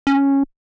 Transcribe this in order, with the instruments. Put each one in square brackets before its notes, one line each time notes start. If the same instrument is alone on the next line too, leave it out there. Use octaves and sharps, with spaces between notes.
[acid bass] C#4